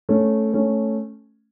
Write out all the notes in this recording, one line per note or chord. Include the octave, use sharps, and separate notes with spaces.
A3 C#4
A3 C#4